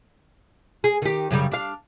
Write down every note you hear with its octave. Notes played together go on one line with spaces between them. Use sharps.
G#4
D#3 G4
F#2 C#3 G3
D4 F5